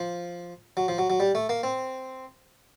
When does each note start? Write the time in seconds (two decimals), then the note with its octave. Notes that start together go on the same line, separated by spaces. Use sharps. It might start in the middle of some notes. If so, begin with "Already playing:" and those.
Already playing: F3
0.77 F#3
0.88 F3
0.98 F#3
1.10 F#3
1.20 G3
1.35 A3
1.49 A#3
1.63 C4